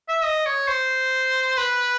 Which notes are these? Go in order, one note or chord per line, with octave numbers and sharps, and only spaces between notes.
E5
D#5
C#5
C5
B4